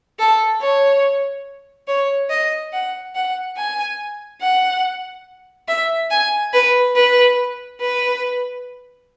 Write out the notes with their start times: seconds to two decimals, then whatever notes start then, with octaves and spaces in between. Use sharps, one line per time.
0.19 A4
0.62 C#5
1.87 C#5
2.30 D#5
2.73 F#5
3.15 F#5
3.57 G#5
4.41 F#5
5.68 E5
6.11 G#5
6.53 B4
6.96 B4
7.81 B4